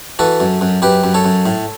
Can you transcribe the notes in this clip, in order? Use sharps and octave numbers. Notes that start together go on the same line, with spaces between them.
E3 F#4 A4
F#2
F#2
F#2 G4 B4
F#2
A4 C#5
F#2
A2